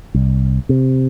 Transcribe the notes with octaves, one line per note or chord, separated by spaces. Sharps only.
C2
C3